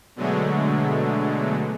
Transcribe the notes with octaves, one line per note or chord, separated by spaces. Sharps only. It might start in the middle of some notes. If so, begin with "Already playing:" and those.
B2 D3 F#3 G#3 A3